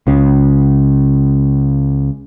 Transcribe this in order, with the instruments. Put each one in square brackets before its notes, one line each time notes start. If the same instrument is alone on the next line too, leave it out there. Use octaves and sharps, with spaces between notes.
[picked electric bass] C#2 C#3